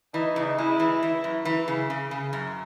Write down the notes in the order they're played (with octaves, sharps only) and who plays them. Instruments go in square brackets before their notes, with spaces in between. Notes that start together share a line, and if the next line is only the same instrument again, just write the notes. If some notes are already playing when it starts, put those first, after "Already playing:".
[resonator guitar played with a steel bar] E3 [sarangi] D#4
[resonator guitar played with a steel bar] C#3
[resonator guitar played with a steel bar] G#3 [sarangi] E4
[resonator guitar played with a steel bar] E3
E3
F#2
E3
C#3
C#3
C#3
F#2